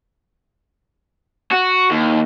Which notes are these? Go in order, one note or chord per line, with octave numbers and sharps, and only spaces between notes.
F#4
D#2